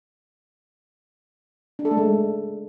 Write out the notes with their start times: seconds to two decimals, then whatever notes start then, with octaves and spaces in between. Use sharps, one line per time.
1.79 D4
1.85 A4
1.91 A3
1.97 G#3